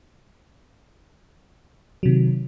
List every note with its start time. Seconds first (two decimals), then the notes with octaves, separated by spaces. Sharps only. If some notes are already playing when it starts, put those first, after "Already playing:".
2.03 F#3
2.05 C3
2.08 D#3